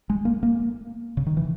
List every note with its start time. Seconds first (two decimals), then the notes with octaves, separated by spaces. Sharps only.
0.10 G#3
0.25 A#3
0.43 A#3
1.17 C#3
1.26 D#3
1.37 E3